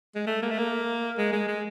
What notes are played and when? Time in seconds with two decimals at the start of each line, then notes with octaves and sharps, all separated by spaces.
0.15 G#3
0.27 A3
0.42 A#3
0.51 A3
0.59 A#3
1.18 G#3
1.32 G#3
1.48 G#3